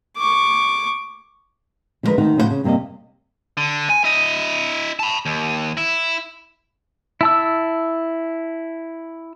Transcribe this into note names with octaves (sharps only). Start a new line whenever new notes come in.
C#6 D6
D3 F3 G3 G#3 A#4 B4
D2 D#3 D#4 C5 F#5
A2 C#3 F3 D#4 C5 F#5
C#3
G2 C3 A#3 D5 D#5
D3
G#5
E4 D#5
A5 B5
D#2
E4
E4 A5 E6